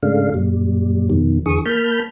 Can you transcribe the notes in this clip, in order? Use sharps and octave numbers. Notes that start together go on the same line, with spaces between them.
G#2 C#3 G#3 A3 D4 F5
F#2 A#2 G3
F2 B2 D#3
E2 D3 E3 G#4 C#6 D#6
A#3 A5 B5 F6 G6